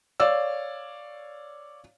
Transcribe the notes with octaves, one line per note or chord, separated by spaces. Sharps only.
C#5 D5 F5 E6